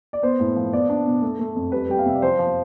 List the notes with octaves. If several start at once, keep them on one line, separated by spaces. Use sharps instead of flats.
D5
B3 C5
A2
F3
B3 D5
D4
B2
A3
A3
F2
G3 B4
G3 G5
F5
C3 E5
D5
F3 C5
F3